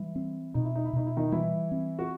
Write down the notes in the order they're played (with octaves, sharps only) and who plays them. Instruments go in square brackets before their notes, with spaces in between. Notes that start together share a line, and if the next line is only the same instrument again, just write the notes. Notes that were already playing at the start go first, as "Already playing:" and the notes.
Already playing: [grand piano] E3 E4 [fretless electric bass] G3
[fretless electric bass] C4
[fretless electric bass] B2 [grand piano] D#4
[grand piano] E4
D#4
E4
[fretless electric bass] B2 [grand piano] D#4
[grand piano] E4
D#3 D#4
[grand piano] E3 E4 [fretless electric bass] G3
[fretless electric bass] C4
[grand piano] F#4